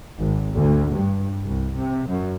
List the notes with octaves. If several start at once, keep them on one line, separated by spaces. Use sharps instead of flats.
G#1
D2
G2
C2
C3
F#2